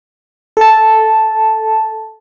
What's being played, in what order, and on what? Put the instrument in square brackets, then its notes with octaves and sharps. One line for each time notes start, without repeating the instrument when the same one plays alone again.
[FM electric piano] A4 A5